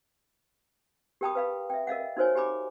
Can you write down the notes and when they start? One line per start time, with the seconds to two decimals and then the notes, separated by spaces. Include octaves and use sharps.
1.21 G4 A#4 G5 A5 B5 D#6
1.35 B4 F5 B5
1.70 E5 G5
1.87 A#4 D#5 F5 F#5
2.17 D#4 F#4 A#4 C5 C#5 G#5
2.35 G4 G#5 B5 D6